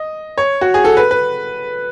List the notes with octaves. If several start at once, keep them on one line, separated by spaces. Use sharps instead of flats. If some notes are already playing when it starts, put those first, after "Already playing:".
Already playing: D#5
C#5
F#4
G#4
A4
B4
B4